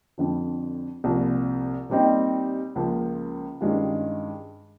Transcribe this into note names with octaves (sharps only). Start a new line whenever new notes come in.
F2 D3 F3
C2 A#2 F3
A#2 G3 C4 D#4
C#2 C#3 F3 A#3
G2 D#3 G#3 C#4 F4